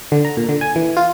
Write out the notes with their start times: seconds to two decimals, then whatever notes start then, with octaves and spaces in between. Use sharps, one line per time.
0.12 D3
0.25 A#5
0.37 A#2
0.49 D3
0.61 G#5
0.76 E3
0.97 F4